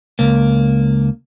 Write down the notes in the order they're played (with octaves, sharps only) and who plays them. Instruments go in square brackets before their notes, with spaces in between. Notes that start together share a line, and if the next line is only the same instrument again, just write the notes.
[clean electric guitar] C#2 A#3